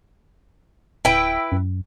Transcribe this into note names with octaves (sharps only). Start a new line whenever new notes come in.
D1 E4 B4 G5
F#2